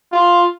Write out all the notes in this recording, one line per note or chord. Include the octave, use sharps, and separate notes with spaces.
F4